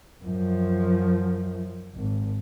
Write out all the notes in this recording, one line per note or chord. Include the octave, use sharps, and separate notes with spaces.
F#2 F3
G#1